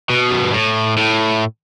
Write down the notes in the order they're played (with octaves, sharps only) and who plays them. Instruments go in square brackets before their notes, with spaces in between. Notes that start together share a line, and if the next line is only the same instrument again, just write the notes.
[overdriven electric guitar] B2
F#2
G2
A2
A2